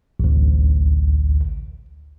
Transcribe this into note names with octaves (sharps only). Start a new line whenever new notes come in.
A1 D2